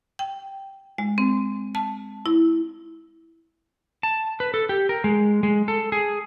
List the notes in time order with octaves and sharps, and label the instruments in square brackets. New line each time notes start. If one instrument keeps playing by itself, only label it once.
[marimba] G5
G#3
C4
A5
E4
[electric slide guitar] A5
B4
A4
G4
A#4
G#3
G#3
A4
G#4